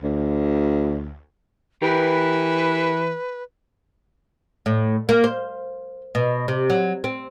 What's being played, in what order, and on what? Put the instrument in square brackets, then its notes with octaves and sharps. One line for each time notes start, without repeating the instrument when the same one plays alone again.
[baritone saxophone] D2
[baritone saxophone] E3 [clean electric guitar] G4 A#4 [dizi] B4
[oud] A2
A#3
C5
B2
C3
F#3
C4